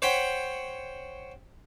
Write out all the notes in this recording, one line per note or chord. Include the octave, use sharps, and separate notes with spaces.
C5 C#5 F#5 G5 B5